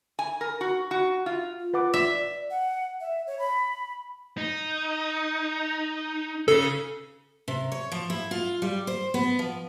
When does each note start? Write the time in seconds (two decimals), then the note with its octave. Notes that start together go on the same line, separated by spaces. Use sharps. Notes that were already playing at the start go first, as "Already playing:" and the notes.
0.19 G#5
0.41 A#4
0.61 F#4
0.91 F#4
1.26 F4
1.60 F4
1.74 B4 F#5 D6
1.94 E5
2.10 D5
2.50 F#5
3.01 E5
3.27 C#5
3.39 B5
4.38 D#4
6.48 C#3 A4
7.48 C3
7.72 C#5
7.92 F3
8.10 E4
8.31 F4
8.62 G3
8.87 C5
9.14 B3
9.39 F3